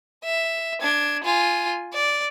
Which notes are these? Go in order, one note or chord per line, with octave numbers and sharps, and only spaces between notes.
E5
D4 G#6
F4 G#5
D5